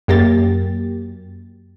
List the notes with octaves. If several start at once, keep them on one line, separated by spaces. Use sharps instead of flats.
F#2 A#3 G4 A6